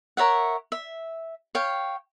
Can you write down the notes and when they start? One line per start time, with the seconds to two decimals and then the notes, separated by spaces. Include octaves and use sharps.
0.17 A#4 C#5 E5 F#5
0.72 E5
1.55 C#5 F5 G5